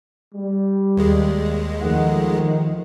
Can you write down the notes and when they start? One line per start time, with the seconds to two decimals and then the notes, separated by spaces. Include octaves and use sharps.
0.34 G3
0.97 D#2 G#3
1.82 D#3 F3 A3 F#5